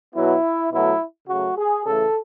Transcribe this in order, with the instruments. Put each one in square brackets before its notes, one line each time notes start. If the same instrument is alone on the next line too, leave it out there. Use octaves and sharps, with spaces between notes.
[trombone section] B2 F#3 B3 E4
B2 F#3 A3 E4
C#3 F#3 A3 F#4
G#4
C#3 E3 A3 A4